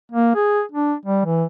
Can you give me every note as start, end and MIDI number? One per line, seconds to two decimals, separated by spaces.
0.11 0.35 58
0.35 0.62 68
0.72 0.94 62
1.05 1.23 55
1.25 1.44 52